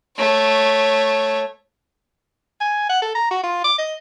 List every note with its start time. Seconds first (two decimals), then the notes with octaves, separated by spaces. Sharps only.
0.17 A3 C#5
2.61 G#5
2.89 F#5
3.02 A4
3.15 A#5
3.31 F#4
3.44 F4
3.64 D6
3.78 D#5